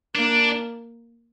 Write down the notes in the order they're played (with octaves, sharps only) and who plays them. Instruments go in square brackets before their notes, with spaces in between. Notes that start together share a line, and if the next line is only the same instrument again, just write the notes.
[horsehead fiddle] A#3 [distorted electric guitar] D4